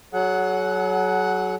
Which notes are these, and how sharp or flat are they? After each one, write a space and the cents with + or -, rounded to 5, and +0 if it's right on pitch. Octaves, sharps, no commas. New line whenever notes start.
F#3 +15 G#4 +45 F#5 +0